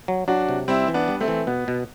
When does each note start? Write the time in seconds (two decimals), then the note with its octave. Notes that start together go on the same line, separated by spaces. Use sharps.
0.08 F#3
0.28 F#3 D4 F#4
0.49 C3
0.68 G3 C4 E4
0.88 E3
0.94 B3 D4
1.08 G3
1.20 A3 C4
1.28 E3
1.47 B2 B3
1.68 B2